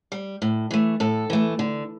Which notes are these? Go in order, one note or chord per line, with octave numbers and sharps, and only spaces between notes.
G3
A2
E3 A3
A2 A4
E3 A3
D3